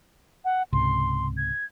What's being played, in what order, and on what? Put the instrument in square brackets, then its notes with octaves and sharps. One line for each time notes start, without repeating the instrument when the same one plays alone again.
[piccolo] F#5
[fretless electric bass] C#2 G#2 C3 [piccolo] C6
[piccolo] G#6